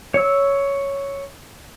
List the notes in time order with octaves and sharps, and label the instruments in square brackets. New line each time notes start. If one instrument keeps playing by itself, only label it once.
[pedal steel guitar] C#5 E6